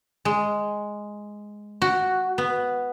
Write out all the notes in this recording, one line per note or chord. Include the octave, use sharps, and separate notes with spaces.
G#3
F#4
B3